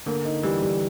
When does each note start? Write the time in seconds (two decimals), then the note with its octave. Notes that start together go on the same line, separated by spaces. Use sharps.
0.06 D3 A#3
0.25 D#4
0.43 E3 G3
0.62 G3